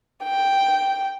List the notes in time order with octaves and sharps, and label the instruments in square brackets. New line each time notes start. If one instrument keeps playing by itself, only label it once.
[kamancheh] G5